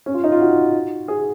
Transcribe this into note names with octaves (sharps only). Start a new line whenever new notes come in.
C#4
F4
D#4
F4
F#4
G#4